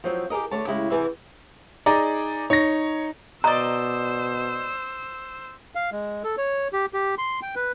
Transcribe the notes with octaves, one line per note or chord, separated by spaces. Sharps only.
F3 F#3 C4
G4 G#4 A#4 D#5
D3 A3 C#5 A5
C#3 G#3 E4 G4
E2 C3 E3 G#4 B4 E5
D#4 G#4 D5 A#5
D#4 C#5 A#6
B2 C5 D5 D#5 A#5 E6
F5
G#3
A4
C#5
G4
G4
C6
G5
B4